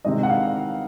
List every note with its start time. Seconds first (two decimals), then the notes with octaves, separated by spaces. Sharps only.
0.05 C3 D#3 G#3 D#5
0.23 F#5
0.29 F5